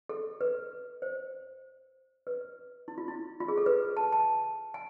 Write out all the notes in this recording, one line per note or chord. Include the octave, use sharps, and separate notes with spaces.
A4
B4
C5
B4
E4
F4
E4
F4
G#4
A4
B4
A5
A5
G#5